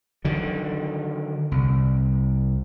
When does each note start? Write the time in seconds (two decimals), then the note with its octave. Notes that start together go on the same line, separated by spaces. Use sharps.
0.25 D3 D#3 F#3
1.51 C2